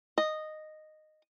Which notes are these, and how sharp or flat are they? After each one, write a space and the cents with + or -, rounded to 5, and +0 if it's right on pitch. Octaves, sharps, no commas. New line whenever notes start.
D#5 -10